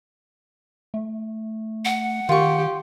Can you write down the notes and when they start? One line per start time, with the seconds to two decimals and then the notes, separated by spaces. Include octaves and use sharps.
0.94 A3
1.85 F#5
2.29 D#3 F4 G4 C#6